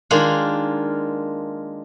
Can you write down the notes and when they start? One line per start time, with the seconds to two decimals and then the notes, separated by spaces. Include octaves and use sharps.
0.11 D#3 G#3 A#3 D4 F4